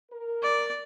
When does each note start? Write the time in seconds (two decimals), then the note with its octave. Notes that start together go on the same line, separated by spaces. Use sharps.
0.11 A#4
0.42 D5